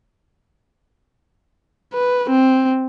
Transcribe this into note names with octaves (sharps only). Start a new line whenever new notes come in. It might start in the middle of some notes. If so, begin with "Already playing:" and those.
B4
C4